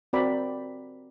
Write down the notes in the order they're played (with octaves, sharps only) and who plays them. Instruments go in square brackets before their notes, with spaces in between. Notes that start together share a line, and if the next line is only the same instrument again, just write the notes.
[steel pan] C4 F#4 A#4 D5 G5 B5